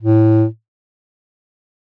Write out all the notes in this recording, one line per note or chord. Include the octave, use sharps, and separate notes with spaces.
A2